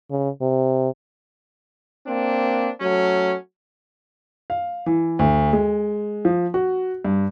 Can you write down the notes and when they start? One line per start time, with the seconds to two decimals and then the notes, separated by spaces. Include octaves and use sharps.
0.10 C#3
0.41 C3
2.05 A#3 C4 D4
2.80 F#3 A3 C#4
4.50 F5
4.86 E3
5.19 D2
5.53 G#3
6.25 F3
6.54 F#4
7.05 G2